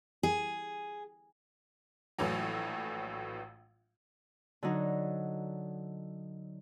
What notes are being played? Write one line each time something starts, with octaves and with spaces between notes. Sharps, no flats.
G#4
A#1 A2 E3 F#3
D3 F#3 D#4